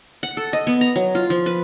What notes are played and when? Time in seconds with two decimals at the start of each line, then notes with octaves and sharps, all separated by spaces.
0.23 F#5
0.37 A4
0.53 D#5
0.67 B3
0.81 A#5
0.96 F#3
1.15 F4
1.30 F3
1.46 B4